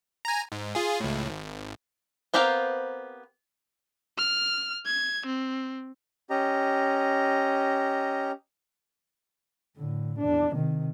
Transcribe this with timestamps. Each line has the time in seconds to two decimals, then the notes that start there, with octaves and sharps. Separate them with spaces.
0.25 G#5 A#5
0.52 G#2
0.75 F4 G#4
1.00 C#2 A2
1.29 G#1
2.34 B3 C4 G4 A#4 F5
4.18 F6
4.86 G#6
5.26 C4
6.30 C#4 G4 D#5 A#5
9.77 A2 D3
10.19 E2 D4
10.53 C3 D#3